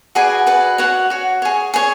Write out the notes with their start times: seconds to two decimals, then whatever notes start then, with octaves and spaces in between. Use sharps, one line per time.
0.15 F#4 G#4 B4 D5 G#5
0.47 F#4 B4 D5
0.78 F#4 C#5 F#5
1.10 F#4 C#5
1.42 G#4 C#5
1.74 G#4 C#5